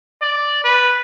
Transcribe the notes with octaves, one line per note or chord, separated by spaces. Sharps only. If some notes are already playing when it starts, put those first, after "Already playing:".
D5
B4